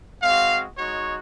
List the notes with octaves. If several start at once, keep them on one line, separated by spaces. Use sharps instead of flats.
G#3 C4 F#4 F5
G#3 D#4 F#4 C#5